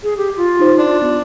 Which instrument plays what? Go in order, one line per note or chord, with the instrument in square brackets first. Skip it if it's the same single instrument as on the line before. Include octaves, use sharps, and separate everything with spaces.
[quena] G#4
G4
F4
[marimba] D#4 C5
[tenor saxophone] D4
[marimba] B3